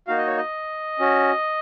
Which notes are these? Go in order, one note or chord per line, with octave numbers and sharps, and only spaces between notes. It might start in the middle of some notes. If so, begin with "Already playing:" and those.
A#3 D#4 F#4 F5
D#5
C#5
D#5
C#4 F#4